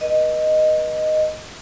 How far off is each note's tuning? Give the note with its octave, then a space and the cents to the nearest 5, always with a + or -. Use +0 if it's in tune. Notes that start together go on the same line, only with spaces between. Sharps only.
B4 -35 D#5 -5